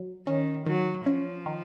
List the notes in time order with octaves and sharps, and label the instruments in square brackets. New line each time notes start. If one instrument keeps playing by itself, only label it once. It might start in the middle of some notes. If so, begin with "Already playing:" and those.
Already playing: [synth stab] F#3
[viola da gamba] D#3 [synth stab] C#4
[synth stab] D#3 [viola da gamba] F#3
[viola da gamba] F3 [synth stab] C#4
[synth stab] D#3